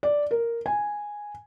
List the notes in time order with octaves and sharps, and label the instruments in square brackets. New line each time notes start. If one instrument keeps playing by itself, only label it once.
[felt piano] D5
A#4
G#5